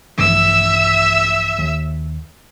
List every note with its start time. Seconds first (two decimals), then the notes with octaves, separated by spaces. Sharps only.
0.18 A#1 G2 E3 E5 E6
1.58 D#2